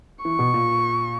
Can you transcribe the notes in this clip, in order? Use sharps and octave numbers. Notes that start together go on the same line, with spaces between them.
E3 C#6
B2
A#2